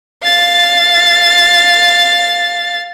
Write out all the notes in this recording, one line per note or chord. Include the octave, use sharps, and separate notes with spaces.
F5 A6